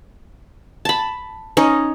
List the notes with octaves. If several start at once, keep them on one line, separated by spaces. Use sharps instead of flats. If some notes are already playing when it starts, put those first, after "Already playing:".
A5 B5
C#4 D#4